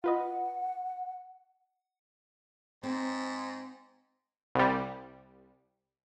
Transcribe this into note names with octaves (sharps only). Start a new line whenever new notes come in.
F4 B4 D#5 F#5
G#2 C4
C2 G3